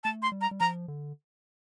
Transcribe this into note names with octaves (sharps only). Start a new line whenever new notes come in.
A3 A5
C6
G3
A#5
G3
F3 A#5
D3